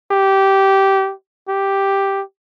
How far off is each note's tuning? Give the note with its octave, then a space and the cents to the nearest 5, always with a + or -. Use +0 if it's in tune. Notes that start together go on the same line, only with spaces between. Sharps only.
G4 -15
G4 +0